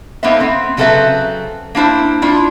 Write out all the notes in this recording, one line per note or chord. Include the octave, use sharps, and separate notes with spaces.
A#3 B3 D#4 A4 C5 E5
B3 C4
C#3 F#3 C4 A4 B4 E5
A#3 D4 E4 C5
D4 E4 F4